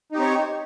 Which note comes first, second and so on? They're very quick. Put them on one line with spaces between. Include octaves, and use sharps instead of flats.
D#4 G4 C4 C#5